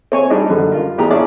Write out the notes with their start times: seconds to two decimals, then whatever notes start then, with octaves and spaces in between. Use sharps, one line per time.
0.12 C4 C#5 G#5
0.30 G3 D4 D#4 G#4 D#5
0.50 F#2 D3 G3
0.72 F4 A#4
0.98 A1 B3 G4 G#4 A#5
1.11 C#4 D4 E4 F4 G#4 D5